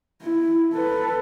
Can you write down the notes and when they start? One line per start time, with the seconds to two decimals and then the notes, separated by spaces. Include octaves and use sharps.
0.22 E4
0.74 A4 B4